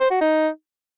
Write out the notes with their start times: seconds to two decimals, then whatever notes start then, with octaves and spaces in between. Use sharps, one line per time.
0.01 C5
0.11 F#4
0.21 D#4